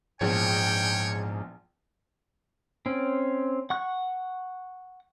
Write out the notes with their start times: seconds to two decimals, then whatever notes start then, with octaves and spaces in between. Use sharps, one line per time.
0.21 A#1 E2 G#2 F3 C#5 G5
2.86 C4 C#4
3.70 F#5 C#6 F#6